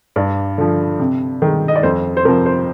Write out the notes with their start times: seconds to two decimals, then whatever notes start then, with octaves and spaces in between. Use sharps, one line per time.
0.16 G2 D5
0.58 D3 F3
1.00 C3
1.42 D#3 G#3
1.68 D#5
1.76 D5
1.83 F2 C5
2.17 C5
2.25 C3 F3 A#4
2.46 C5